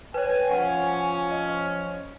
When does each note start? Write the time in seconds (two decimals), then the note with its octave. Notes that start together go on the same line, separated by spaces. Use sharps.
0.14 B4 C#5 G5 G#5
0.50 F3 C#4 F#5 G#5
1.31 D#5